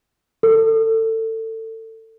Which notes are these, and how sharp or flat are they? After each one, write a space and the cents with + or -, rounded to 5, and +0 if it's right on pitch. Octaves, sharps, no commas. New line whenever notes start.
A4 +25